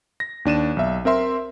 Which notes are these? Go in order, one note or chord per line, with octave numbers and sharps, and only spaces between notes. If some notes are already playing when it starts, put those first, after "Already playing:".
A#6
D#2 D4 D#7 E7
B1 E5
C4 A#4 E5 C6